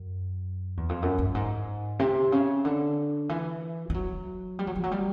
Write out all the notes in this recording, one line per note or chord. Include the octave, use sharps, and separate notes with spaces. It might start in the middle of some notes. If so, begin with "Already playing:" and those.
Already playing: F#2
E2
F2
F#2
G2
G#2
C3
C#3
D3
E3
G3
F#3
G3
F#3
F3
F#3
G3